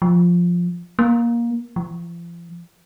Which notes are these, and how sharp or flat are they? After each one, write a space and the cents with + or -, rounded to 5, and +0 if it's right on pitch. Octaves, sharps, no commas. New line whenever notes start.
F3 +5
A#3 +15
F3 -40